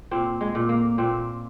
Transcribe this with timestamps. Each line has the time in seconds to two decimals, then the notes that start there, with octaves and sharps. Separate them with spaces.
0.11 A#2 C4
0.41 G#3
0.55 A#2
0.69 A#3
0.98 A#2 C4